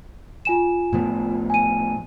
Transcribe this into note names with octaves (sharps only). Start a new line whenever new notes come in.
F4 G#5 E7
A2 F3 B3
G#5 D#7